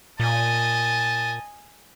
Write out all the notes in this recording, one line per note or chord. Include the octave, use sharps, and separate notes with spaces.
A#2 D#5 G#5 A5